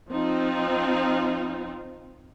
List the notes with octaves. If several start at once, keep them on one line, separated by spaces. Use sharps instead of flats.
F3 C4 D#4 F4